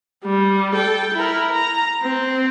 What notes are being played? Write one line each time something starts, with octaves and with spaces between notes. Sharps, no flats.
G3
A4 G5
E4 A#4
A#5
C4